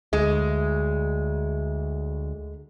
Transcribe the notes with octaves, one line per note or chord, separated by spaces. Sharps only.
D2 G#3